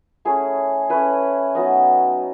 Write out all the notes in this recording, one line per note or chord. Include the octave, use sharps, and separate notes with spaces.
A3 C#4 E4 G#4
A3 C#4 E4 B4
F#3 B3 D#4 D#5